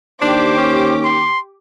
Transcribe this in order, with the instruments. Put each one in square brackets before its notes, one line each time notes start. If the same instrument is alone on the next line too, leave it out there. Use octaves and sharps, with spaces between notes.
[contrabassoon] D#2 [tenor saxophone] D4 [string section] G4 D6 [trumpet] C5
[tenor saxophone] C#4
[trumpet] C6